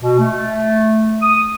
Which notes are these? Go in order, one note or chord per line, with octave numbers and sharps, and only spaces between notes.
B2
A3
D#6